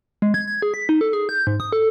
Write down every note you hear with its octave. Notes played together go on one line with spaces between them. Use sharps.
G#3
G#6
G#6
G#4
B6
D#4
A4
G#4
G6
G#2
D#6
A4